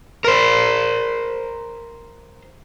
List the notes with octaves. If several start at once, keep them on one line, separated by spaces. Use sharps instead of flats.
A#4 C5